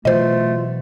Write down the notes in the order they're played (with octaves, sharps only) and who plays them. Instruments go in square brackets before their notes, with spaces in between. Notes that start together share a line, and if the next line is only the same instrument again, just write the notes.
[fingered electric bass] B2 E3 F#3 [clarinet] A3 [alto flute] F4 [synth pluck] C5 D#5